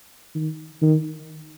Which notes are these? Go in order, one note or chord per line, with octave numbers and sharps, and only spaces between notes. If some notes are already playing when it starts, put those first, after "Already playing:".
D#3
D#3